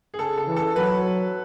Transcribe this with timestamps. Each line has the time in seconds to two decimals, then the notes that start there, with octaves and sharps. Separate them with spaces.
0.14 G#4
0.19 C#3 A4
0.37 A4
0.47 E3
0.57 A4
0.76 F#3 B4